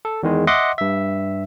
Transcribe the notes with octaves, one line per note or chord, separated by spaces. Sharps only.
A4
E2 D#3 G#3
D#5 E5 F#5 C6 D6
G2 E5